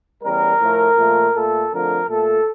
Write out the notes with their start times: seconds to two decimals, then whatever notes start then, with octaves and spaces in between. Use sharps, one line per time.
0.24 E2 C#3 G3 A#4
0.60 A2 F3 A3
0.97 A#2 F3 A3
1.35 A#2 A3 A4
1.72 F2 D3 F3 A3 A#4
2.09 A#2 A3 A4